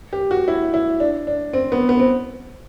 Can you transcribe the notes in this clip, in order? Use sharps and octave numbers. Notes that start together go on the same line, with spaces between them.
G4
F#4
E4
E4
D4
D4
C4
B3
B3
C4